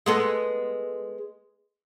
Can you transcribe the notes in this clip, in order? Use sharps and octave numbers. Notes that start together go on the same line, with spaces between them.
G#3 B3 A4